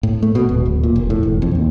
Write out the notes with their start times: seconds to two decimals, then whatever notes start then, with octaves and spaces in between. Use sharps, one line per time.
0.03 A2
0.23 A3
0.35 B2
0.49 D#1
0.66 D1
0.83 A#2
0.96 F1
1.10 A2
1.23 E1
1.42 F2
1.55 D#2